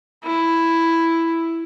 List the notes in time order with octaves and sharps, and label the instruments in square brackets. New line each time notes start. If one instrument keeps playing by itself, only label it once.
[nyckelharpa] E4